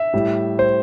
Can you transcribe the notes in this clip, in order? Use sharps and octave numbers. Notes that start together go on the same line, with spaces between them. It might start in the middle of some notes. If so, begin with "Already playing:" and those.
Already playing: E5
A2 G3
C5